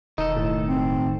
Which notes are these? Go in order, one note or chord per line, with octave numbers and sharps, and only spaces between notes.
E1 D#3 D#4 A4
A2
C4